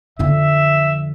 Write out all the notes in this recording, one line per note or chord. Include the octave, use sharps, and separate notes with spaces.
F2 D3 E5